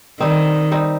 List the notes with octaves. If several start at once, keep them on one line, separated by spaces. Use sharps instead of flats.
D#3 G3 C4 D#4
G3 C4 D#4